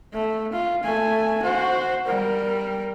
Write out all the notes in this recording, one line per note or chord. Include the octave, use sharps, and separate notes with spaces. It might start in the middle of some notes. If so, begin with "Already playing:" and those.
A3
F4
A3 G#5
F#4 C5
G3 A#4